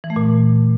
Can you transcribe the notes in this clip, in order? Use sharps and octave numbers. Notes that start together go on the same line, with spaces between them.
E3
A3
A#2